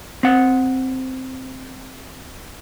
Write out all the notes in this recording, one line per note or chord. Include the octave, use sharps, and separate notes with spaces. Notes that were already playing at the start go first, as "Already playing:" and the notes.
C4 F#5